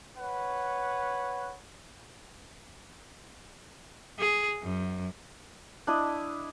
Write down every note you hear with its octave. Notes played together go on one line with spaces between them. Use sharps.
B4 C#5 F#5
G#4
F#2
D4 E4 D#5